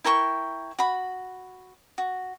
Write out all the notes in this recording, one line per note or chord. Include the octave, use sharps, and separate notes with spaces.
E4 A#4 G5 C#6
F#4 B5
F#4